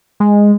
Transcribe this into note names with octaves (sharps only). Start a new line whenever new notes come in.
G#3